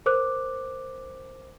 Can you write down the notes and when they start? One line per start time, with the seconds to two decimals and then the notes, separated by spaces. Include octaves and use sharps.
0.06 A#4 C5 D6 F#6